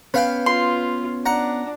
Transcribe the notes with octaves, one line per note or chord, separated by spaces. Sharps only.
B3 C#4 B4 F5 G5
F4 C6
D4 F#5 A#5